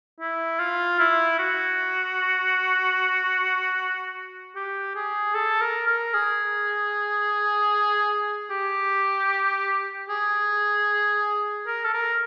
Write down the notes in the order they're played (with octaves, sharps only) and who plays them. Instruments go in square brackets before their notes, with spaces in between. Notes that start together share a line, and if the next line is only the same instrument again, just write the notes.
[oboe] E4
F4
E4
F#4
G4
G#4
A4
A#4
A#4
G#4
G4
G#4
A#4
A4
A#4